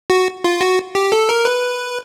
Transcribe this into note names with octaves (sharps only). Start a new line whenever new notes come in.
F#4
F4
F#4
G4
A4
A#4
B4